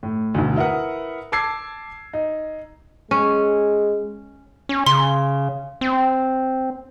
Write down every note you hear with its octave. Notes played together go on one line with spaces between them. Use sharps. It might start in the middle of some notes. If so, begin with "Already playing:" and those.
A2
E1 D2
E4 A#4 B4 F#5 D#6
A5 D6 E6 G#6 C7
D#4
G#3 C#4
C#4
C#3 C6
C4